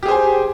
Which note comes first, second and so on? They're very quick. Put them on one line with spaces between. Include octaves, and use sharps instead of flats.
G4 G#4 C5 G#5